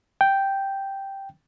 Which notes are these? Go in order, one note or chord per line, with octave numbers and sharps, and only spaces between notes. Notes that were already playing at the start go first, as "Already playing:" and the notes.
G5